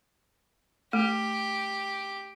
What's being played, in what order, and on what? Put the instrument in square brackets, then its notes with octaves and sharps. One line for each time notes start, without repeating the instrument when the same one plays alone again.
[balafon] A3 [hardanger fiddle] G4